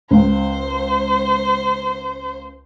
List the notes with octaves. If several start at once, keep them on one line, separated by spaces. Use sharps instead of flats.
C#2 C5